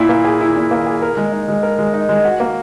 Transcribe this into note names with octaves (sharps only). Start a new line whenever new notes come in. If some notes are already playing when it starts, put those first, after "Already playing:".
Already playing: A#2 E4
A#3
G#4
E4
A#2
A#3
G#4
A#4
G#3
D#4
G#3
A#4
G#3
D#4
G#3
F#4
A#3